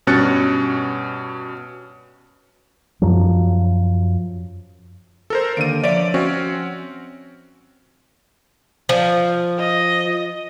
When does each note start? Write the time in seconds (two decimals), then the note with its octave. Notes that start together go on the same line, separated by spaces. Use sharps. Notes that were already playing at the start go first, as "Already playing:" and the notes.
0.07 G2 B2 C#4 F#6 A6 C#7
3.02 F#2 F3 F#3
5.30 A4 A#4 C5
5.57 D#2 D3 D7 D#7
5.84 F3 C#5 D5 E5 D7
6.14 C4 C#4 F#4
8.89 F3
9.59 D#5